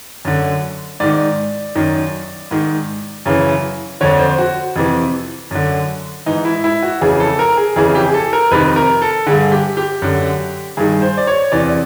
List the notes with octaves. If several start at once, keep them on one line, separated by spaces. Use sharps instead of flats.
F#2 D3
G#2 D#3 D5
F#2 D#3
G#2 D#3
F#2 C#3 E3
F2 D3 C#5
C5
F#4
F2 C3 E3
F#2 D3
G#2 E3 D#4
E4
E4
F#4
F2 C#3 E3 G#4
A4
A#4
G#4
F2 C#3 E3 G#4
G4
G#4
A4
A#4
F2 C3 D#3 B4
A#4
A4
G2 D3 G#4
G4
G4
F#2 D3
G2 D#3 G#4
C5
D5
C#5
E2 C3 E3 D5